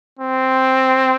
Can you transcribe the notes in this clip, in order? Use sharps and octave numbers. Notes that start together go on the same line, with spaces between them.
C4